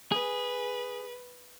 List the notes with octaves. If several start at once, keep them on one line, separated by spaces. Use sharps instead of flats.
G#4 B4